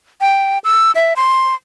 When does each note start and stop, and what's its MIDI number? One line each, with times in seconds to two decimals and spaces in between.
0.21 0.59 79
0.64 0.91 88
0.95 1.13 76
1.16 1.55 84